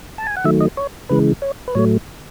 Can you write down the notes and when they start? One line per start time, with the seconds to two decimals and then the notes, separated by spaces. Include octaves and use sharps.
0.18 A5
0.27 G#5
0.36 F#5
0.44 D#3 F#3 A3 E5
0.60 D#5
0.77 C#5
1.09 C#3 E3 G#3 B4
1.42 C#5
1.68 B4
1.75 A2 F#3 A3 C#5